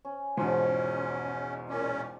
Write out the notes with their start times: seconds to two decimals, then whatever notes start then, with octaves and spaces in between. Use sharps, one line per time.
0.05 C#4
0.37 E2 G#2 B2 F3 C#4 F#5
1.69 A#2 C#4 D5